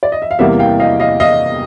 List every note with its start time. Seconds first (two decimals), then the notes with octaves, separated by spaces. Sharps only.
0.03 D5
0.12 D#5
0.22 E5
0.31 F5
0.39 E2 C3 E3 G3 A#3 E5 F#5
0.59 F5 G5
0.80 D#5 F5
1.00 D#5 F5
1.20 D#5 F5